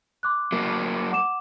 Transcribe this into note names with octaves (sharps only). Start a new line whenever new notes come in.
C6 D6 F#6
F#3 A#3
F#5 D6 E7